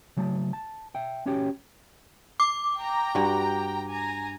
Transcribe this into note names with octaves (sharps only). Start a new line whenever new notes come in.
C#3 F#3 A3 A5
A5
E5 G5
C#4 F#4 G4 C#5 G5
D6
G5 A#5
G2 F#4
G#5 A#5